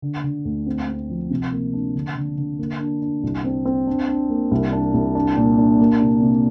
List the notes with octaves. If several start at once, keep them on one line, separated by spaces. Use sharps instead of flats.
D3
D3
D2
C4
C4
F3
C3
A#3
D4
D3
D3
D3
A#3
D4
D4
C2
C4
C4
D4
D4
A#3
C2
D4
C2
D4
A#2
D4
A#3
C3
C3